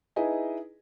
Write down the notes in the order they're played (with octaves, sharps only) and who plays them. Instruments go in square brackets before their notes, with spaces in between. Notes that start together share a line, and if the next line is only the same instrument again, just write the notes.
[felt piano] D#4 E4 G#4 B4 D#5 G#5